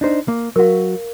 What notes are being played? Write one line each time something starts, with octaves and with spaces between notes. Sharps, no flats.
D4 D#4 C5
A#3
F#3 F#4 A#4 F5